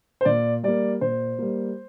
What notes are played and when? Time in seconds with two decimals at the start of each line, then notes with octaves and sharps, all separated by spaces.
0.21 C5
0.25 A#2 D5
0.63 G3 A#3 D5
1.01 A#2 C5
1.39 G3 A#3